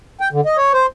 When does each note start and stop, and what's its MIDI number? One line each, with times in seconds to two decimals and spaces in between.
0.20 0.29 79
0.33 0.41 50
0.45 0.57 75
0.57 0.72 73
0.73 0.86 72